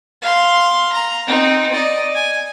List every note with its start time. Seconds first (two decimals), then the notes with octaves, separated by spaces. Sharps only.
0.22 F5 C6
0.93 A#5
1.27 C4 D#4
1.72 D5 D#5
2.15 G#5